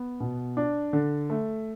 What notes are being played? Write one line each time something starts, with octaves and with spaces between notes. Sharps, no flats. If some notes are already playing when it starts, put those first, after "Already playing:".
Already playing: B3
B2
D4
D3
A3